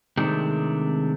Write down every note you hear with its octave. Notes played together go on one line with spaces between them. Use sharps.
C3 D#3 G#3 A3 C4 D4